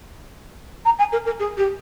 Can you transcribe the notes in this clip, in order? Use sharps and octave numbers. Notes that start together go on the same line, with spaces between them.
A#5
G#5
A#4
A#4
G#4
G4